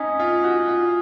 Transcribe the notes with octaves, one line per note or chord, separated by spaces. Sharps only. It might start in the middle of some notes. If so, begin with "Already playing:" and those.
Already playing: C#4 D#4 G#5 D#6 G#6 B6
F4
F#4
F4